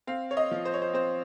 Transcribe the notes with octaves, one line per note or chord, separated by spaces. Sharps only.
C4 F5
C#5
D#5
F3
C5
C#5
C5
C4 C5